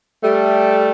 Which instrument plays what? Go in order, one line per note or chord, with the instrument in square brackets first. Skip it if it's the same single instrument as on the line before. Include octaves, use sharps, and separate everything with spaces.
[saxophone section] G3 A3